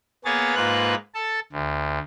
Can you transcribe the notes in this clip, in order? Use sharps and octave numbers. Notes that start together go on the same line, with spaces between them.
A#3 B3 G#4 C#5 A6
G#2 A#3 F4 B4 F#6
A4 A5
D2